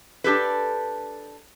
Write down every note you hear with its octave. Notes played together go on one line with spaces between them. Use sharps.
D4 G4 A4 B4